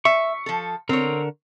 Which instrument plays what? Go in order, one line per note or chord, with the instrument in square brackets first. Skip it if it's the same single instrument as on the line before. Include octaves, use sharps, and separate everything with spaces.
[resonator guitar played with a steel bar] E5 [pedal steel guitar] C#6
[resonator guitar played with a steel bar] F3 A4
[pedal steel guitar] D3 A#4 [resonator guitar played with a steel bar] C4 C#5